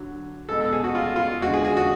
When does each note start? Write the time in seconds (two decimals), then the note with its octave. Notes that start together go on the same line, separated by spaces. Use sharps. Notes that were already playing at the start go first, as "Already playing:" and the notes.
Already playing: D3 F#3
0.49 B2 G#3 A4
0.61 A4
0.73 G#4
0.84 F#4
0.95 F4
1.16 F4
1.41 G#3 F#4
1.47 D3
1.54 G#4
1.65 G#4
1.77 F#4